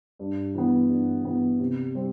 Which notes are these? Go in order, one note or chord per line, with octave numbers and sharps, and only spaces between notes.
G2
E3 B3
G2
E3 B3
C3
G3 C4